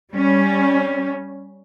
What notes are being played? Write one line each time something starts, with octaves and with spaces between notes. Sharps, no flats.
G3 C#4